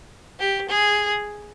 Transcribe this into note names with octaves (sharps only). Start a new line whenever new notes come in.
G4
G#4